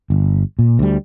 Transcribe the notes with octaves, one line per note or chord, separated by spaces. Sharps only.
G1
A#2
D2 G3